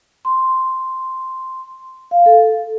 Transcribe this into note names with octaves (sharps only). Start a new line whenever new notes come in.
C6
F5
A4